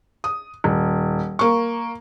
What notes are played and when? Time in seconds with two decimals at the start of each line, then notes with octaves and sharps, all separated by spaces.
0.24 D#6
0.64 D#1
1.39 A#3 C#6